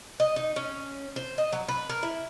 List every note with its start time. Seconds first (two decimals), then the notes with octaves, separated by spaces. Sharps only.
0.20 D#5
0.36 D#4
0.56 C#4
1.16 C5
1.38 D#5
1.53 F#3
1.68 B4
1.90 A#4
2.03 E4